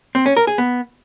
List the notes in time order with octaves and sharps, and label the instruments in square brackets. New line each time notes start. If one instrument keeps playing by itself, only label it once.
[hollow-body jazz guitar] C4
C#4
A#4
G#4
B3